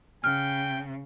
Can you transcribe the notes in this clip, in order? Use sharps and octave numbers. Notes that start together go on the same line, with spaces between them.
C#3 G5 F6